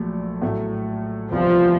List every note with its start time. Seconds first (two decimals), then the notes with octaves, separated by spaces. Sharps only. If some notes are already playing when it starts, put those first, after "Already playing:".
Already playing: A#1 A#2 F#3 A3
0.42 A2 F#3 A3
1.30 E1 D2 C3 E3 F3 G3